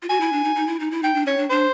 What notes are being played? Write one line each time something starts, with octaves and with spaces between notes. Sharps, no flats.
F4
F#4 G#5
E4
D4
D#4
D#4
E4
D#4
E4
D#4 G5
D4
C#4 C#5
D4
D4 C5